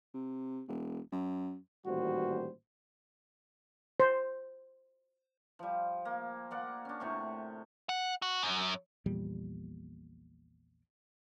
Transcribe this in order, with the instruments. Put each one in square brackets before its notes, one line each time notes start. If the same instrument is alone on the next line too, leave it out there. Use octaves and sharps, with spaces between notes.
[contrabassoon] C3
E1
F#2
[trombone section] A1 A#2 D#3 G3 F#4 C5
[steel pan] C5
[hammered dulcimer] F3 G3
A#3
A#3 D5 F#5
C#4 D4
A2 C3 C#6
[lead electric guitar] F#5
F#4
F#2
[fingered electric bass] A#1 E2 A#2 G3